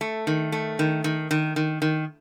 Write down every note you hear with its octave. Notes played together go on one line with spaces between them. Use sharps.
A3
D#3
A3
D#3
D#3
D#3
D#3
D#3